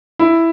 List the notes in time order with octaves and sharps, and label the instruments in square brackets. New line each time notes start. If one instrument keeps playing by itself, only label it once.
[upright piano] E4